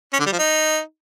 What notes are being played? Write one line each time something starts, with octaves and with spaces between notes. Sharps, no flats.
C#4
D3
G3
F3
D#4